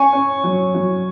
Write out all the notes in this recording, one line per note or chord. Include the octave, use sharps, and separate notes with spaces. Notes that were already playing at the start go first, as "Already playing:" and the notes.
Already playing: C#4 G#5 C#6
C#4
F#3
F#3